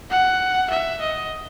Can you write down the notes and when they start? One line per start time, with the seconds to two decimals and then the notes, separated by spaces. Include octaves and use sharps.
0.10 F#5
0.71 E5
1.01 D#5